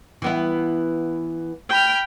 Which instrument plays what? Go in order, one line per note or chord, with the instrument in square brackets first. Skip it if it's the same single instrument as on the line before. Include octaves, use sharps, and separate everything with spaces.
[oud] E3 B3 E4
[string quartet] G5 B5 F6